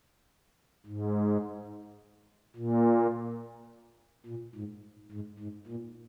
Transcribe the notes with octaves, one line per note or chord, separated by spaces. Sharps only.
G#2
A#2
A#2
G#2
G#2
G#2
A#2